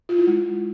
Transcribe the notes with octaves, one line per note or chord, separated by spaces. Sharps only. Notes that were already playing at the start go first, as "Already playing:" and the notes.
F4
E4
G#3